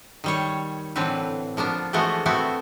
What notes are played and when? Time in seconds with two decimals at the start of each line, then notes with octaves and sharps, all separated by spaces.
0.24 D#3 G3 C#5
0.96 A2 D3 E3 C4 B4
1.57 F3 A#3 B3 D4
1.93 E3 F3 G#3 A3 B3 F#4
2.26 A3 B3 C4 E4 F#4